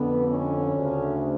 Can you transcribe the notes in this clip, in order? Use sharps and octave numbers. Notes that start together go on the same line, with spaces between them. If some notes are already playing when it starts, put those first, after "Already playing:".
Already playing: F2 D3 B3
C#4
D2 C#3